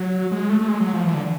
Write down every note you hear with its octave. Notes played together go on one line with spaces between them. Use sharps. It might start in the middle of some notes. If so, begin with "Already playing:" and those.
Already playing: F#3
G#3
A3
A3
G#3
F#3
F3
E3
D3